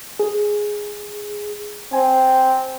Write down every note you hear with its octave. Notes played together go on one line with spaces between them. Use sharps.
G#4
C4 G#5